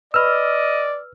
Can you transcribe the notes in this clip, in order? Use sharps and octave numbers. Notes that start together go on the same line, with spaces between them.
B4 D5 D#5 B5 E6 F6